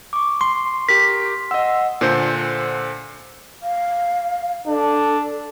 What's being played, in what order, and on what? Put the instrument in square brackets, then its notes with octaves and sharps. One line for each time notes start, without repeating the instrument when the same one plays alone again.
[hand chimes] C#6 D6
[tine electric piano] C6
[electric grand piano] G4 A#4 [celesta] B6
[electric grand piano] D#5 E6 [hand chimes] F#5
[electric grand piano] A#2 D3 A4 C5 G6
[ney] F5
[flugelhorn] D4 [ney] A4